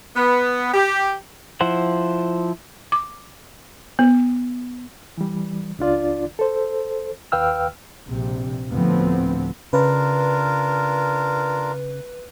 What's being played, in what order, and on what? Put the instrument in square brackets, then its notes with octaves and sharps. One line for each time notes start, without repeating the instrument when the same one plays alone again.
[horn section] B3
G4
[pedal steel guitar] F3 E4 C5 F#5
[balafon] D6
B3
[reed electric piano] E3 G3
C#2 D4 F4 D5
A4 C5
D#2 B4 F5 G5 E6 F6
[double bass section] A#1 C3
D2 A2 F3 B3 C4
[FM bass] C#3 [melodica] D4 F4 A#4 [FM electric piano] B4